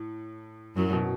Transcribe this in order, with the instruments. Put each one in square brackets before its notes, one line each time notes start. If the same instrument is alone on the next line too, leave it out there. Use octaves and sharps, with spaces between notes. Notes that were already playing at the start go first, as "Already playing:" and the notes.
Already playing: [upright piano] A2
[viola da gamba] F#2 F#3 [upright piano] A2
[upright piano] B2